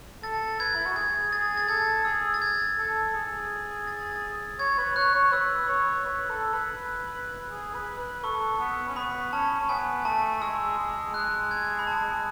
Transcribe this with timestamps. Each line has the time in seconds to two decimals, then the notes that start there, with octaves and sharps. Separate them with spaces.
0.23 A4 A6
0.60 B4 G#6
0.75 E4
0.86 F#4
0.96 G#4 G#6
1.32 G#4 A6
1.57 A6
1.68 A4 G#6
2.05 G#4 E6
2.34 A6
2.42 G#6
2.79 A4
3.15 G#4
3.87 A6
4.59 C#5 G#6
4.78 B4
4.96 C#5 F#6
5.15 C#5
5.32 B4 E6
5.69 C#5
6.05 B4
6.29 A4
6.53 B4
7.51 G#4
7.74 B4
7.99 B4
8.24 A4 C#6
8.60 B3
8.89 C#4
8.96 B3 B5
9.33 C#4 A5
9.61 C#4
9.69 B3 G#5
10.05 A3 A5
10.41 G#3 E6
10.78 G#3
11.14 G#3 F#6
11.51 G#6
11.79 B5
11.87 A5